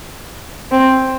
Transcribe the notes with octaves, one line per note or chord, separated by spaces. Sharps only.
C4